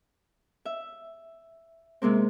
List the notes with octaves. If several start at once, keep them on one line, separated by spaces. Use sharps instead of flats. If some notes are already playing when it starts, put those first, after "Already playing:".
E5
C3 G#3 A#3 C4